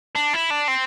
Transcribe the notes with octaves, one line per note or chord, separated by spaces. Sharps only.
D4
E4
D4
C4